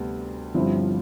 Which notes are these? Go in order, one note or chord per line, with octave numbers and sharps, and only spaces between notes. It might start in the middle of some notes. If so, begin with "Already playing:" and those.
Already playing: D2 C3 G3 B3
G1 G2 F3 C4 E4